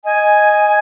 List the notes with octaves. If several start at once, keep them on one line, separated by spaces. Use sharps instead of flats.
D#5 G#5